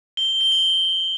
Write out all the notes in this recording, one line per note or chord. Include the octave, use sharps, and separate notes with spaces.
G7
G7
F#7